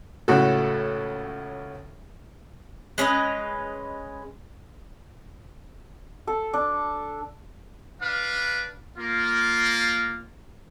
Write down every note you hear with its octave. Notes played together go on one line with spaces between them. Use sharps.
C#2 A2 F#4 A4
G#3 C#4 B4 D#5
A4
D4
D4 B4 F5
A#3 F4